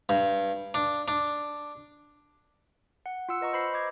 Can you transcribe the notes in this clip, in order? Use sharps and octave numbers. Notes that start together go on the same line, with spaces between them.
G2
D4
D4
F#5
F4 F#5 E6 C#7
B4 D#5 A#5 C#6
C5 B5 C7
D#5 D6 G#6